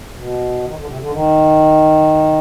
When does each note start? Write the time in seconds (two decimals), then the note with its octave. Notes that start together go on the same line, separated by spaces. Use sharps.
0.16 B2
0.64 D#3
0.75 D3
0.86 C3
0.97 D3
1.11 D#3